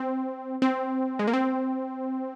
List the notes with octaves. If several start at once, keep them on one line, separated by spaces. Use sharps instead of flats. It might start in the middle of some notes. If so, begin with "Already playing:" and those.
Already playing: C4
C4
G#3
A#3
C4